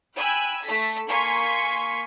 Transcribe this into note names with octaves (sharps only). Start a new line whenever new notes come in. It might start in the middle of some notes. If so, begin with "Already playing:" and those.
G5 G#5 B5 E6 F#6
A3 A4 B6
A#3 G#5 C6 C#6 B6 C#7